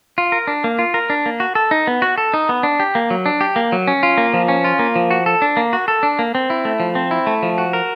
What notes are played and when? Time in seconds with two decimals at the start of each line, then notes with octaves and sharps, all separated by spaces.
0.18 F4
0.32 A#4
0.47 D4
0.64 A#3
0.79 F4
0.94 A#4
1.10 D4
1.26 A#3
1.40 F#4
1.55 A4
1.71 D#4
1.87 B3
2.02 F#4
2.18 A4
2.34 D#4
2.49 B3
2.63 D4
2.80 G4
2.95 A#3
3.10 F#3
3.26 D4
3.41 G4
3.56 A#3
3.72 F#3
3.88 C#4
4.03 F4
4.18 A#3
4.34 F3
4.48 C#4
4.64 F4
4.79 A#3
4.96 F3
5.11 F#4
5.26 A4
5.42 D4
5.57 A#3
5.73 F#4
5.88 A4
6.03 D4
6.19 A#3
6.35 C4
6.50 E4
6.65 A3
6.80 F3
6.95 C4
7.11 E4
7.27 A3
7.43 F3
7.58 F#4
7.73 A#4